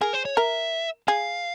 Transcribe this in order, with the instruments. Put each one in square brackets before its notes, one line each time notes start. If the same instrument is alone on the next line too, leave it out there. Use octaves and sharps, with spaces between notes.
[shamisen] G#4 [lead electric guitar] A#4
[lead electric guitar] C5
C#5
[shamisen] A#4 [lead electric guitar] E5
[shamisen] G#4 [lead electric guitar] F5